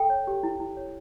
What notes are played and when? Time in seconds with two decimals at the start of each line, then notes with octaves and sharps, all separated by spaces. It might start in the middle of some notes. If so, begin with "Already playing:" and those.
Already playing: A4 G5
0.10 C#5
0.27 G4
0.43 E4
0.60 E4
0.77 C#5